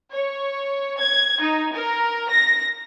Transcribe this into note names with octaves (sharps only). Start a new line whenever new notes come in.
C#5
G#6
D#4
A#4
A#6